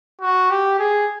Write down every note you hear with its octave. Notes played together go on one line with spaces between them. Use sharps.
F#4
G4
G#4